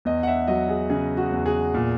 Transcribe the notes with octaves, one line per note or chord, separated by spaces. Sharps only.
E2 D#5
F#5
E5
F#3 D#5
G#4
C#3 G#4
F#4
E2
G#4
A#2